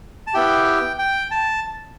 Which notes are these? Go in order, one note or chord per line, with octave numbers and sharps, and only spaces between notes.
A5
B3 E4 G4 G5
G5
A5